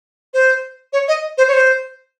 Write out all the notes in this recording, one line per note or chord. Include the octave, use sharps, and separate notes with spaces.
C5
C#5
D#5
C5
C#5
C5